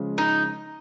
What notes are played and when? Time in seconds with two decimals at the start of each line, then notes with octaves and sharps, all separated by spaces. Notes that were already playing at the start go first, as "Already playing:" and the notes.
Already playing: C#3 F3 G#3
0.18 D#4